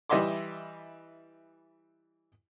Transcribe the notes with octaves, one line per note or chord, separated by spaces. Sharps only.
E3 G3 D#5 E5 C6 D6